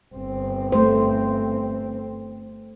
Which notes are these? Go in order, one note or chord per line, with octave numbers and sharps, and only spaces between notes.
G1 C4
A3 C5